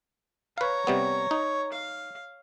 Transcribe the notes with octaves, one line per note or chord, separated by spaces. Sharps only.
B4 C#5 F5 A#5
C3 G3 B3
D#4
F5